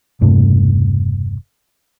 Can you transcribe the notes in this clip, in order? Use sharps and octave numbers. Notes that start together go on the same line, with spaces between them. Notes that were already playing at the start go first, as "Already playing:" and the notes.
E1 G2 C3 A3